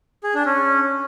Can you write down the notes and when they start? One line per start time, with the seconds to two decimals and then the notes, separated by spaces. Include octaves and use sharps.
0.24 G#4
0.35 D4
0.46 C#4